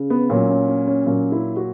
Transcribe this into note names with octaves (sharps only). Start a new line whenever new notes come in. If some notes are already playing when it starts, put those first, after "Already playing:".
Already playing: C#3
B3
A#2 F#3 C#4
C#4
C#4
C#4
A#2 F#3 C#4
E4
F#4